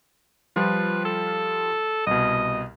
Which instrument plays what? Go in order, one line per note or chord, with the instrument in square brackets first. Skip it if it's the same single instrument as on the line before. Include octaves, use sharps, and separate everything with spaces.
[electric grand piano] F3 G3 F4 [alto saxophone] B4
[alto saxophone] A4
[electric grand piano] C2 B2 [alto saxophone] D#5